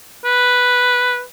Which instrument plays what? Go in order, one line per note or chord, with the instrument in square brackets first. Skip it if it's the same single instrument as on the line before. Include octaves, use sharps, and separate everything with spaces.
[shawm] B4